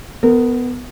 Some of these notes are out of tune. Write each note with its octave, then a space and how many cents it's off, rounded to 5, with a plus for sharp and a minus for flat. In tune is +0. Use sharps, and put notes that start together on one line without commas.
B3 +10 A#4 -25